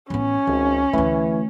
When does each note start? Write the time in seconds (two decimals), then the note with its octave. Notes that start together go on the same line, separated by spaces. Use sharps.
0.10 A1 B3 C#4
0.47 G#1 C#2
0.93 D2 E3 A3